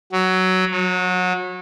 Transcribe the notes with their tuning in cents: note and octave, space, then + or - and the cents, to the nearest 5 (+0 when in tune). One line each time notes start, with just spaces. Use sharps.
F#3 +10
F#3 -25